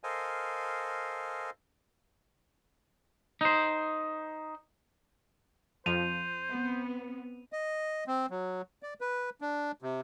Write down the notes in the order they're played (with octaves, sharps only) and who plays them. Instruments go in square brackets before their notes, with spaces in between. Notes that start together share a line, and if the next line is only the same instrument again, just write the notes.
[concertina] A4 A#4 C5 D#5 F5 G#5
[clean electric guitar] D#4 C5
[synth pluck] F2 F3 [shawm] C5 [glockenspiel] D#7 F7
[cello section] B3 C4
[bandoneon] D#5
C4
F#3
D5
B4
D4
C3